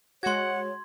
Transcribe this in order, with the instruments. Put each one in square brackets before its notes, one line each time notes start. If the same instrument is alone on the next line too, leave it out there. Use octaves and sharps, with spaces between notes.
[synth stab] G#3 F#4 [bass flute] C#5 [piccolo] F#5 [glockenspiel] C6 G#6